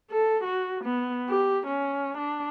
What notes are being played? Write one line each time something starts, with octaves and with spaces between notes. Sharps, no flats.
A4
F#4
B3
G4
C#4
D4